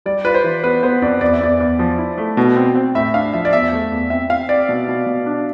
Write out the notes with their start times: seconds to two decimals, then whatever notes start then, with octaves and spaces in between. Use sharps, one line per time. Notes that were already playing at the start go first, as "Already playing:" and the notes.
0.06 G3 D5
0.25 F4 B4
0.34 C5
0.44 E3
0.63 B3 B4
0.83 B3 C5
1.02 F2 D5
1.21 E2 D5
1.33 E5
1.40 E2 D5
1.60 E2
1.79 F3
1.98 E4
2.18 A3
2.37 B2
2.56 C4
2.75 C4
2.95 A2 E5
3.14 D4 F5
3.34 F3 E5
3.45 D5
3.53 E2 E5
3.73 A3
3.92 E2
4.10 C4 E5
4.29 C4 F5
4.49 C4 D5
4.69 B2
4.88 B2
5.06 B2
5.26 D4